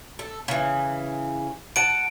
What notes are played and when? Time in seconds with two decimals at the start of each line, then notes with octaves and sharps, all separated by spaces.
0.19 A4
0.48 C#3 E3
1.76 F#5 A5 D7 D#7